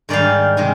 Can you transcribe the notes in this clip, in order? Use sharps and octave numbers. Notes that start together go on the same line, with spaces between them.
G#2 D#3 G3 D5 F5
C3 D#3 G#3